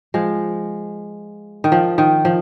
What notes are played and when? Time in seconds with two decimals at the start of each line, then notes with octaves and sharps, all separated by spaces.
0.14 F3 G#3
1.64 D#3
1.72 F3
1.98 D#3
2.25 F3